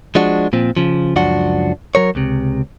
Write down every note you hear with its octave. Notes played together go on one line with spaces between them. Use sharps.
F3 G#3 D4 F#4
A#2 F3 C4
C#3 F3
C#2 F#2 F3 D4 F#4 F#5
F#3 A#4 C#5
C#2 C3